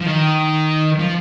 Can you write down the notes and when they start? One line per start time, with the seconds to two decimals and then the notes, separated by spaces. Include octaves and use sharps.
0.01 F3
0.06 D#3
0.99 F3